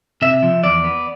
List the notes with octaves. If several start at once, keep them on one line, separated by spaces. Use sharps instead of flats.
C3 E5
F3
E2 D5
B3